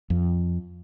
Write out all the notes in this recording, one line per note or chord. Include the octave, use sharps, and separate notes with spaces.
F2